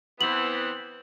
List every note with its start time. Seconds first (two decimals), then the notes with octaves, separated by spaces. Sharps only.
0.21 E3 B3 C4 F#7